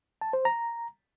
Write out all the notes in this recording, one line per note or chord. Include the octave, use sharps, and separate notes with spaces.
A5
C5
A#5